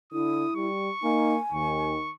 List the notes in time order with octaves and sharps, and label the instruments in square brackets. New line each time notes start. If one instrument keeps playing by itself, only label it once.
[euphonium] D3 [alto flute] E4 [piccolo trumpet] D#6
[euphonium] G3 [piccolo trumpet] C#6
[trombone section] A#3 [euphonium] D#4 [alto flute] G#5
[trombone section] D#2 [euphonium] D#3 [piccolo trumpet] C#6